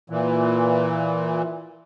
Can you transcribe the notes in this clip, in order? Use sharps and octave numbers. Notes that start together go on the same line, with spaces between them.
A#2 E3